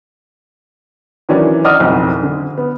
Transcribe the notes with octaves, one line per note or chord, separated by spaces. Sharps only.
D#3 E3 F#3 C#4 D4
D5 D#5 F#5 D#6 F6
F#1 B1 F2
D3
B3